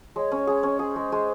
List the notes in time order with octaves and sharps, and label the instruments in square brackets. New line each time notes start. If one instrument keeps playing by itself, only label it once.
[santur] G#3 [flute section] C#5
[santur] C#4
G#4
C#4
[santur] G#4 [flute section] C5
[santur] G#3
G#3